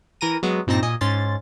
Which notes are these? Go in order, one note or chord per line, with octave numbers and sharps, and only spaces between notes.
E3 A#4 A#6 D#7
F#3 G#3 B3
G2 A#2 C4 D#4 A5 A#6
A#2 D#5 G#5
G#2 C#4 C6 A6